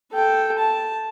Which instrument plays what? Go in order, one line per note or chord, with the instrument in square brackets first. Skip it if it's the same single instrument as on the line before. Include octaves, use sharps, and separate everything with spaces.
[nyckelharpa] A4 G5
A5